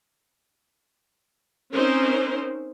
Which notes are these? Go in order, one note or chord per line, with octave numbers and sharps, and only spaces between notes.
C4 C#4 D#4 A#4 C5